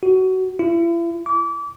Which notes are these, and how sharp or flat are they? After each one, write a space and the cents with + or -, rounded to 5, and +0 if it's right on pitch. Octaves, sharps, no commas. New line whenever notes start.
F#4 +20
E4 +40
D6 -30